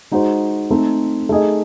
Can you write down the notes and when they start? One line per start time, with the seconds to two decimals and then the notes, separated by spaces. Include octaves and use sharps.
0.11 G#3 D#4 F#4 C5
0.70 A3 C4 D#4 A4
1.29 A3 D#4 G#4 D#5